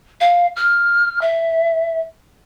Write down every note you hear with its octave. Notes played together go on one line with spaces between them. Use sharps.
F5
F6
E5